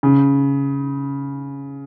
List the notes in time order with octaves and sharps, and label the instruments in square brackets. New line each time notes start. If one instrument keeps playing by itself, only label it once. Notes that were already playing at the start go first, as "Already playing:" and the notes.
[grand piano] C#3